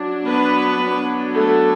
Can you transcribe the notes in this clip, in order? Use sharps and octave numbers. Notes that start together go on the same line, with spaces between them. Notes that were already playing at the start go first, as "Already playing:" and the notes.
Already playing: F#3 D4
B3 B4
F#3 B3 D4
A3 A4